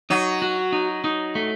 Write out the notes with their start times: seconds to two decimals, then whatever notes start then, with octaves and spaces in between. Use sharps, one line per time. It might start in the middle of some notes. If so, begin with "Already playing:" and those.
0.10 F#3 D#4
0.42 F#4
0.72 D#4
1.04 D#4
1.35 A3